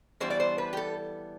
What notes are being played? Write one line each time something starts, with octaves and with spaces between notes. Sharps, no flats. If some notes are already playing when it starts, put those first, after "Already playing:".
E3 G3 B3 D4 C5
D5
C5
B4
G4
A4